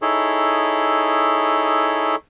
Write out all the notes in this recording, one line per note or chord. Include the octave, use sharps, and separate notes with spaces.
D#4 E4 G#4 A4 C#5